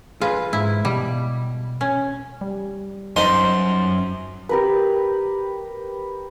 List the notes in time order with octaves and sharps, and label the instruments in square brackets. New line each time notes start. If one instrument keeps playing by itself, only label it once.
[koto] F4 [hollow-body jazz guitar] G#4 B4
[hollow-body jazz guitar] G#2 [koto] E4
[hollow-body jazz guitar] B2 [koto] G3
[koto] C#4
[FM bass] G3
[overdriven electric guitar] F#2 [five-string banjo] D#4 C5 [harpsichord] C6
[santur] G4 A#4 B4